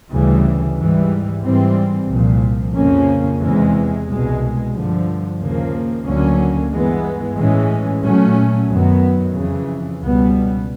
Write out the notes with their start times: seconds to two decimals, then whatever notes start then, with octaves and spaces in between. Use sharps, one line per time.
0.11 D2 C#3 E3 G3
0.77 G#2 E3 G3
1.43 G#2 E3 G3 C4
2.09 C2 A#2 F3
2.75 F2 C#3 F3 A#3 C#4
3.40 E2 C3 E3 G#3
4.07 C2 B2 G#3
4.72 G2 D3 F3
5.38 D#2 C#3 F3 A#3
6.05 D2 D3 F#3 A#3 C#4
6.71 G2 E3 G#3 B3
7.37 A2 E3 G#3 C#4
8.02 A#2 F#3 A3 C#4
8.68 F#2 D#3 F#3 B3
9.34 F2 C#3 E3
10.00 C#2 B2 G3 B3